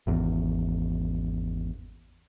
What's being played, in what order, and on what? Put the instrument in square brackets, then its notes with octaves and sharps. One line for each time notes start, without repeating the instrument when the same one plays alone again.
[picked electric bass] G#1 E2